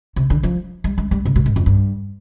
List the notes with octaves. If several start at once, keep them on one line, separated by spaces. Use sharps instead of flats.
C3
D3
F3
G3
G#3
G3
C3
B2
G#2
F2
G2